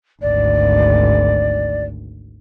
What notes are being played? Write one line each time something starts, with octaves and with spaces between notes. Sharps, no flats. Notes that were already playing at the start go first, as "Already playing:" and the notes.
G#1 D2 D5